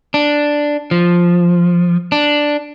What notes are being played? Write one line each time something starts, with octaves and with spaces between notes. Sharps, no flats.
D4
F3
D4